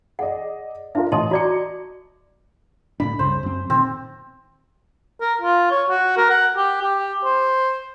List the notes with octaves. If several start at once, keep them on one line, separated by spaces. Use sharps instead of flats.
G#4 D5 D#5 F#5
D4 F4 A#4 E5
A1 D#5 A5 C6 D#6
F#4 D5 A#5 C#6 D6 C#7
D2 A2 D4 B5
C2 G2 C#3 C5
F#2 C4
A#2 D#3 C4
A#4
F4
C#5
F#4
A#4
F#5
G4
G4
C5